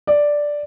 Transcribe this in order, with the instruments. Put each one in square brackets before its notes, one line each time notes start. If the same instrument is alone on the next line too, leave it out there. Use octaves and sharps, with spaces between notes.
[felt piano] D5